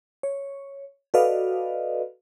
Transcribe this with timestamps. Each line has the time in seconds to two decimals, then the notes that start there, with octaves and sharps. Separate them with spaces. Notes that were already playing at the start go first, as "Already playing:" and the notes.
0.23 C#5
1.14 F#4 A4 B4 D5 D#5 F5